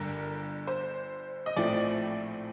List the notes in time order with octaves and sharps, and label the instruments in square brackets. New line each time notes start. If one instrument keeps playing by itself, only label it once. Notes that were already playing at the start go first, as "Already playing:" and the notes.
Already playing: [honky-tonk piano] G1 G2 D3 A#4
C5
D#5
A#1 A2 F3 A3 C4 D5